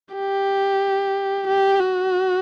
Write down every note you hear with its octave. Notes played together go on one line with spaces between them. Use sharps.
G4
G4
F#4